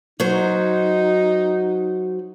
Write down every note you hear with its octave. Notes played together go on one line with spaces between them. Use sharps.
F#3 D#4 F#4 C5